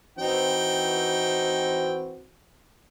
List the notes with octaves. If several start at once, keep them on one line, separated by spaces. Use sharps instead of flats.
E3 C4 D#4 F#4 G5